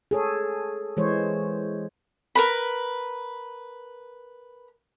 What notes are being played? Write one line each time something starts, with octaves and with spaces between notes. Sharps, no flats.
G#4 A4 C#5
E3 G#3 C5 C#5
A#4 B4 B5